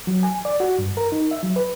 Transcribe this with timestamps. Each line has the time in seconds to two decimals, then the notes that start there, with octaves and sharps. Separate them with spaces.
0.07 F#3
0.23 G#5
0.45 D5
0.60 F#4
0.79 G2
0.97 A#4
1.12 D#4
1.31 E5
1.43 F#3
1.56 B4